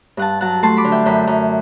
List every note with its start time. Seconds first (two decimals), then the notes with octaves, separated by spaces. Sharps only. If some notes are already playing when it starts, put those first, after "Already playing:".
0.17 G2 F#5 A5
0.41 F#3 F#5 A5
0.63 A3 A5 C6
0.77 B5 D6
0.84 D3
0.92 E5 G5
1.06 F#2 G5 B5
1.27 F#2